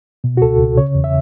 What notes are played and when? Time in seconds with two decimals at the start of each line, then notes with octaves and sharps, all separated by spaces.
0.24 B2
0.37 F#4
0.42 C#2 A4
0.59 C#2
0.77 C#3 C#5
0.95 E2
1.04 E5